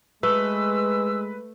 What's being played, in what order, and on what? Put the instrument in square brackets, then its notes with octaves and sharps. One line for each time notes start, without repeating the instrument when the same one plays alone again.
[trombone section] G#3 [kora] A3 [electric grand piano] B4 [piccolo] E6